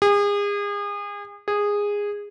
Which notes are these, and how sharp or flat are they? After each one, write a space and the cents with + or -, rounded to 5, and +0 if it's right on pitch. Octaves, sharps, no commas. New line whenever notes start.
G#4 -35
G#4 -15